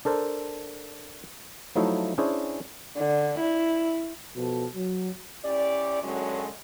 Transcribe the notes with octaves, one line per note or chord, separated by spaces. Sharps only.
D4 A4 A#4 C5
F3 F#3 A3 D#4 E4
C#4 D4 E4 G#4 C5
D3
E4
B2 F3 A4
F#3
C#4 E4 G4 D5
F#2 A2 D3 F#3 G#3 C#4